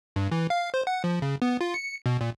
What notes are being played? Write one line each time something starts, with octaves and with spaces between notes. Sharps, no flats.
G2
E3
F5
C5
F#5
F3
C#3
B3
F4
C#7
B2
A#2